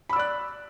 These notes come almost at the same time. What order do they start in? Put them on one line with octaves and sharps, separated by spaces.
B5 E6 D5 F#6